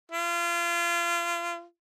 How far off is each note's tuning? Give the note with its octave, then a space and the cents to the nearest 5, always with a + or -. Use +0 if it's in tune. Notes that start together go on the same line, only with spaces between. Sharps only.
F4 -30